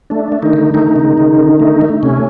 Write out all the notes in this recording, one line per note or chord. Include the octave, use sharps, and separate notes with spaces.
A3 D4
A3
D#3 D#4
D3
D#3 A3 D#4
C#3
C#3
D3
A3
A3
C3 C#4